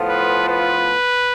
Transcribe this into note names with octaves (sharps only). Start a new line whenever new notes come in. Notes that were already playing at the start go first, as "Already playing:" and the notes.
Already playing: A2 F3 B3 F4 A4
B4
B4